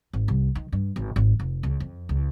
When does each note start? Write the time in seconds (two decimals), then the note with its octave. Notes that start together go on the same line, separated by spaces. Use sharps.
0.13 G#1
0.28 C2
0.55 D#3
0.72 G2
0.96 G#1
1.16 G#1
1.40 F1
1.63 C#2
1.80 F2
2.09 C#2